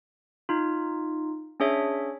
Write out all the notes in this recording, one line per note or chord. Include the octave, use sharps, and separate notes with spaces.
D#4 F4
C#4 D4 G#4 C#5 E5